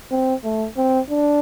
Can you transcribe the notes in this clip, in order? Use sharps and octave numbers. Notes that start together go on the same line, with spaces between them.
C4
A3
C4
D4